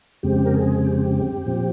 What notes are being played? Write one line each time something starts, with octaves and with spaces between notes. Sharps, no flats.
F2 C#3 G#3 C4 G4
A#4
G#4
G4
A#2 F3 C4